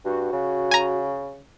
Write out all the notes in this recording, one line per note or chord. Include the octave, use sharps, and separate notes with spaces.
G2 F#4
C#3
G#5 A#5